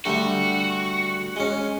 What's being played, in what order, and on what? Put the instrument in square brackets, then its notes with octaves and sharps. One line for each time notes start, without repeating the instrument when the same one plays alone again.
[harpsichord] D3 G3 A3 [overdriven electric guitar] F#4
[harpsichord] G#3 C#4